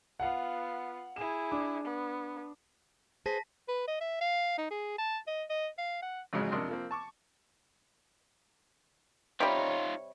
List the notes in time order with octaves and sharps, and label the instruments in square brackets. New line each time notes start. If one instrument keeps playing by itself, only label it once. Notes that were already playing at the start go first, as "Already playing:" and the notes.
[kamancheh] B3 F4 [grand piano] F5 F#5
[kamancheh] E4 G#4 [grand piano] E7
[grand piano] D4 D6
[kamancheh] B3
[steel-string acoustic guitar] G#4 B4 C5 [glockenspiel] A5 A#6 B6
[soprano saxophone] B4
D#5
E5
F5
D#4
G#4
A5
D#5
D#5
F5
F#5
[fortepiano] A1 F2 G#2 C#3 F#3 G#3
F2 C3 D4 A#4 D#5 C6
F3 A#3 C4
A5 C#6 D6
[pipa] C3 G3 [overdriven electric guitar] D#4 F4 [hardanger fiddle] C#5